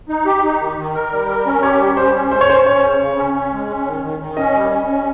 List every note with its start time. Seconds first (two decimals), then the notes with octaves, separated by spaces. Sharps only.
0.09 D#4
0.25 G4
0.43 D#4
0.60 D#3
0.77 D#3
0.94 A#4
1.11 G3
1.29 A#4
1.46 C#4
1.62 G4 C#5
1.80 G3
1.97 C#4 C5
2.15 C#4
2.31 G#3 C5
2.41 C#5
2.49 C#4 C5
2.66 C#4 C#5
2.83 C#3
3.00 C#3
3.17 C#4
3.34 C#4
3.52 G#3
3.69 C#4
3.86 D#3
4.04 D#3
4.20 D#3
4.37 C#4 D#5
4.55 G3
4.71 C#4
4.88 C#4